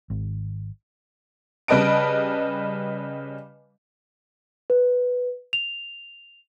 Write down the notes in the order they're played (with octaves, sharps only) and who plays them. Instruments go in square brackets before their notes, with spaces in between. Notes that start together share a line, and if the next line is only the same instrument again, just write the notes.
[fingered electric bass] G#1
[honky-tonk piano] C#3 G3 B4 D#5 A5 D7
[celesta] B4
F7